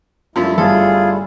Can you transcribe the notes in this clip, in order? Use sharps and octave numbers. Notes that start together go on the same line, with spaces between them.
F#2 F3 G3 A3 E4
G1 F4 G#4 A4